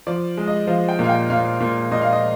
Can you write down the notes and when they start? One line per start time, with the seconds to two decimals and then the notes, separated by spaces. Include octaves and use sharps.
0.07 F3 D5
0.37 G#3
0.48 D#5
0.67 F3 F5
0.88 G5
0.99 A#2
1.04 F5
1.09 G5
1.30 A#2 F5
1.60 A#2
1.91 A#2 D#5
2.02 F5
2.13 D#5